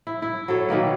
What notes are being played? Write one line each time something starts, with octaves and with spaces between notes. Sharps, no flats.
E4
E4
F#3 A4 C#5
B2 D#3 A#3 B4